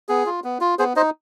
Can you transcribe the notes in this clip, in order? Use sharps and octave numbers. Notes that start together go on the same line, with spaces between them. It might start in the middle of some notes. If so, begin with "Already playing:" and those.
B3 G#4
F4
B3
F4
B3 G#4 C5
D#4 C5 D#5